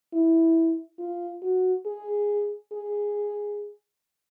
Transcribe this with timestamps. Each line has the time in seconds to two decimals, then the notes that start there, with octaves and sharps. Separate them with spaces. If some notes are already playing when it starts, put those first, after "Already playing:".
0.13 E4
0.99 F4
1.43 F#4
1.86 G#4
2.72 G#4